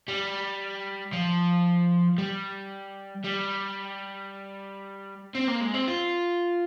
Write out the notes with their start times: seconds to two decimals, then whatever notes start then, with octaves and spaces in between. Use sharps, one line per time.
0.08 G3
1.13 F3
2.18 G3
3.24 G3
5.35 C4
5.48 A#3
5.61 G#3
5.74 C4
5.88 F4